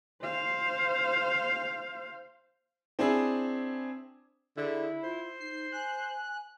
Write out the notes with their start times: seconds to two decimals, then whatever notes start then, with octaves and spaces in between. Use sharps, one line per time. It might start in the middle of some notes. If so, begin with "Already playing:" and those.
0.23 C5 F5
2.99 C4 D4 E4 G#4
4.57 D3 E4 G#4
5.03 F4 C5
5.41 D#4 C7
5.72 G#5 F#6